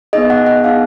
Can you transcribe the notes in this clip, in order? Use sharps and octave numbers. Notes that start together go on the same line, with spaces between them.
B3 D#4 G#4 D#5
F#5
F#5
B3 D#4 G#4 F5